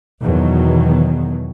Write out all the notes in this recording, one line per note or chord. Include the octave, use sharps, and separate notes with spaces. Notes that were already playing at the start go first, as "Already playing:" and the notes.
E2 B2 D#3 F#3